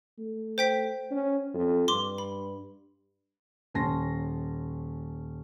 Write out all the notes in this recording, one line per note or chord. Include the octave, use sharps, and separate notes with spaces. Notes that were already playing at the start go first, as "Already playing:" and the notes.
A3
C5 G5 B6
C#4
F2
G2 C6 D6
B5
D#1 C#4 A5 C6 A#6